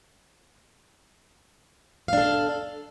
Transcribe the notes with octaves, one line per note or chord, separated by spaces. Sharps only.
D4 A4 F5